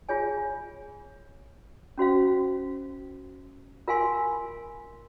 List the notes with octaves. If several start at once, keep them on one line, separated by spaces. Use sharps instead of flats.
F4 G#4 C#5 G#5
C#4 F#4 C5 F5
F4 A#4 F5 G#5 C6